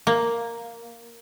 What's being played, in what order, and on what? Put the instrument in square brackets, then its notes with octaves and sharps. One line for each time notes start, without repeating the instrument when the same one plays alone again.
[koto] A#3